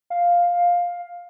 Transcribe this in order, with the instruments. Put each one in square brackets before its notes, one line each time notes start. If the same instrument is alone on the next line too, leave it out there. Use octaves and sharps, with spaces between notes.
[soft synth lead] F5